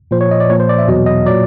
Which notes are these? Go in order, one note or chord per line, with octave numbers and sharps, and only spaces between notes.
A#2 F3 C5
C#5
D#5
D5
A#2 F3 C#5
C5
D5
E5
E2 B2 F#3 D#5
D#5
A#2 F#3 D5